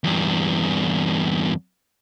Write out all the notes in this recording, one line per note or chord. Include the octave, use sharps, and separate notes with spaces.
E2 G2